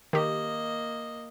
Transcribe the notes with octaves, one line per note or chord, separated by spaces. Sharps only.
D#3 A#3 G4 D#5